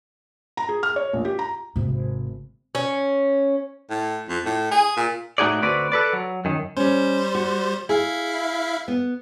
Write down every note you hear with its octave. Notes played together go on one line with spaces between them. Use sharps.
A#5
G#4
F6
C#5
A#1
G4
A#5
G#1 C3
C#4
A2
F2
A2
G#4
A#2
A2 A3 D#4 F#4 G#4 D5
D2 C4 F#4 B4 D5
A4 B4 D5
F#3
F#2 D#3
G3 C#4 C5
F#4
E4 G#4 E5 F5
B3